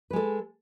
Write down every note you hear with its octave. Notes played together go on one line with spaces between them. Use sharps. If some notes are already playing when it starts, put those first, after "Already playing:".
G#3 A4 B4